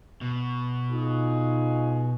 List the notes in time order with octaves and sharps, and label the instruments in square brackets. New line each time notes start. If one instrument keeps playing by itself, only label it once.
[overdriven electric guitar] B2
[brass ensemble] D#4 F4 G#4